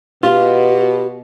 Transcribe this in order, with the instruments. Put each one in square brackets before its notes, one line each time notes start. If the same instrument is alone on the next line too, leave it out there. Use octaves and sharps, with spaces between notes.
[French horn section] B2 [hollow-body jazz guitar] F4 [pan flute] G4